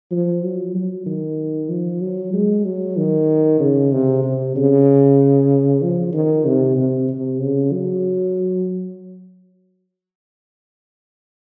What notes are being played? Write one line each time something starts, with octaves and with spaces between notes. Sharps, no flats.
F3
F#3
F#3
D#3
F3
F#3
G#3
F#3
D#3
C#3
C3
C3
C#3
F3
D#3
C3
C3
C3
C#3
F#3